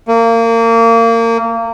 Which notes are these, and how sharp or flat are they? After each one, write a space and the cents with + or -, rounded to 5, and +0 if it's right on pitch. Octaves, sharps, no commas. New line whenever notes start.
A#3 -25